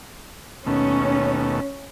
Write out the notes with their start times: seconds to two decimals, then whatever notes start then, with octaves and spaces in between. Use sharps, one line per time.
0.66 D#2 B2 A3 C#4